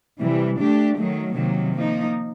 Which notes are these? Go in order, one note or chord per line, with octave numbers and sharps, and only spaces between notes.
C3 E3 G3
A3 D4 G4
D#3 F#3 A3
C3 D#3 F#3 A#3
F3 A#3 D#4